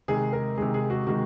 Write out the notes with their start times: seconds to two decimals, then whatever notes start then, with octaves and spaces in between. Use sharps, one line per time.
0.08 C3 D#3 G#3 G#4
0.33 A#4
0.57 C3 D#3 G#3 G#4
0.74 G#4
0.90 F#4
1.07 C3 D#3 G#3 F#4